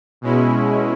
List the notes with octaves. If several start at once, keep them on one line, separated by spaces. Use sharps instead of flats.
B2 G#3 C#4 E4